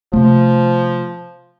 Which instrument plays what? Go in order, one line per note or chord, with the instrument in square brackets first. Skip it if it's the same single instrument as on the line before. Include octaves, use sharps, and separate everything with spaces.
[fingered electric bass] C3 A3 [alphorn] F3